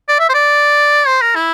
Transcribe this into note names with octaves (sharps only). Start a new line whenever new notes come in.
D5
E5
C5
D5
C5
A#4
E4